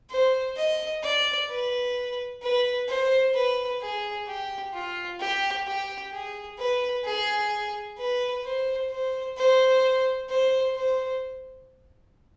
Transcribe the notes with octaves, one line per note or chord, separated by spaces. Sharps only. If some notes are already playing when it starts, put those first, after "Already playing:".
C5
D#5
D5
B4
B4
C5
B4
G#4
G4
F4
G4
G4
G#4
B4
G#4
B4
C5
C5
C5
C5
C5